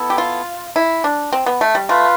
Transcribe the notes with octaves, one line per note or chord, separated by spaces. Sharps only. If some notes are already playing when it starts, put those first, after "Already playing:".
Already playing: B3 E4 A4
G4
F4
E4
D4
C4
B3
A3
G3
A3 F4 B4 F5